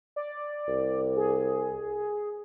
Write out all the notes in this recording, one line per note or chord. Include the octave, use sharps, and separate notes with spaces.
D5
C2
G#4